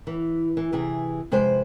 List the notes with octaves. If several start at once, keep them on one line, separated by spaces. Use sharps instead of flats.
E3
E3
C3 E3 G#4
F2 C3 G#3 B4 C5